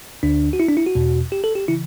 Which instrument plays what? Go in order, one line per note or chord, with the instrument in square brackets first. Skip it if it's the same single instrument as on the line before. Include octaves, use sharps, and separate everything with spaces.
[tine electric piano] D2 D3 D4
F#4
E4
D4
E4
F#4
E2 B2
G4
A4
G4
C#3 E3 E4